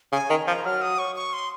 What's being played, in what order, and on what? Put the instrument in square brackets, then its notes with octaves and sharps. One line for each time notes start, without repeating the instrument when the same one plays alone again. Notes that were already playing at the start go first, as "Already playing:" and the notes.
[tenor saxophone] C#3 [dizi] G#5
[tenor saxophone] D#3 [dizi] A#5
[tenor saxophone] F3 [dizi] A#5
[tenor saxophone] F#3 [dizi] F6
[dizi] D#6
C#6
C#6
C6